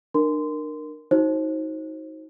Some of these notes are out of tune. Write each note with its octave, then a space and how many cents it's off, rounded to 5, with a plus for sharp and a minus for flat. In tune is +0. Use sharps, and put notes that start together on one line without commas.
D4 +40 A#4 +0 C6 -20
D#4 +30 F#4 +0 C5 +30